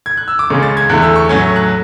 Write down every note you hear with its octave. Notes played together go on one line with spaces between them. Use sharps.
G#6
F#6
E6
D6
C#2 C#3 G#3 C#4 C#6
A6
G#6
E2 D3 A3 E4 F#6
E6
C#6
A2 F#3 A3 C#4 G#6
F#6